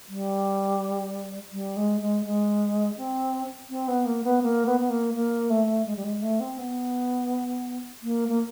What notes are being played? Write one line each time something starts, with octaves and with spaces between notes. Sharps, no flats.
G3
G3
G#3
G#3
G#3
C4
C4
B3
A#3
B3
A#3
B3
B3
A#3
A#3
A3
G#3
G3
G#3
A3
C4
B3
A#3
A#3